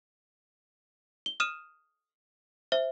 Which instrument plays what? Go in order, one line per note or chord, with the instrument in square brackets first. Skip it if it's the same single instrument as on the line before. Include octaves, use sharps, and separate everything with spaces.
[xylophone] G7
D#6 F6 D#7 E7
C5 E5